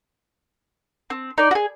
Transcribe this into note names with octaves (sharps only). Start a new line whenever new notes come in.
C4
D#4 D5
F#4 G#4